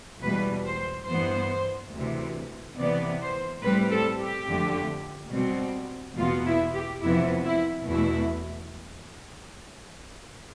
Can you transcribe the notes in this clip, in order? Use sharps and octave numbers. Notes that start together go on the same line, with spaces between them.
E2 B2 G3 B4
C5
G2 E3 B3 C5
D2 C3 E3
C3 E3 B3 D5
C5
A2 G3 C4 B4
A4
G4
F2 D3 A3
B2 G3 C4
E2 B2 B3 F4
E4
G4
F2 C3 E3 B3 E4
E4
E2 B2 A3 E4